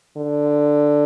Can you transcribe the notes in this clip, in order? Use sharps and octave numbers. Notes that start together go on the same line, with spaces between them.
D3